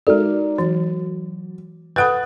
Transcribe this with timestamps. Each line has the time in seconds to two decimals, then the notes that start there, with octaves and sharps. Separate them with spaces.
0.07 G#3 D#4 F#4 A#4 D5
0.58 E3 F#3
1.96 B4 F#5 B5 D#6 F#6 A6